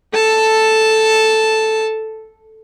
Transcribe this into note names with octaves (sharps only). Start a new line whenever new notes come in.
A4 A5